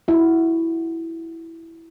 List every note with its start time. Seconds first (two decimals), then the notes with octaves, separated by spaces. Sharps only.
0.08 E4 F#4